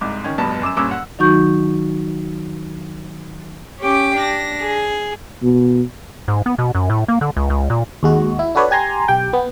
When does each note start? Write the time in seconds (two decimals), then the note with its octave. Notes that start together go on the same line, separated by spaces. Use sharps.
0.01 C2 G#2 D6
0.24 D#3 C#4
0.38 F1 G2 B2 A5 B5
0.62 F#2 D6 E6 E7
0.76 F#1 G2 A#2 C#4 D6 E6
0.91 F#5
1.19 D#3 F#3 D#4 F#4 C#6 G6
3.80 C#4 G4 G5 D6
4.17 D4 A#6
4.60 G#4
5.43 B2
6.28 G#2
6.46 B3
6.58 B2
6.75 F#2
6.90 A2
7.08 A#3
7.21 D3
7.37 C#2
7.50 C#2
7.70 A#2
8.03 D#2 G#3 F#4
8.39 E4
8.55 D4 F#4 A4 B4 C#5 D5
8.71 G4 G#5 A#5 C6
9.08 B1 G4 G5 G6
9.33 B3